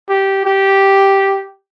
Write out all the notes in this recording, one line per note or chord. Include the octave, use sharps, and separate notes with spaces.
G4
G4